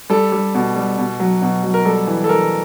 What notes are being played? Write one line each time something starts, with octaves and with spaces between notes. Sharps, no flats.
G3 A4
G3
B2
G3
B2
F#3
B2
F#3
A#4
G3 A4
E3
A4
E3 A#4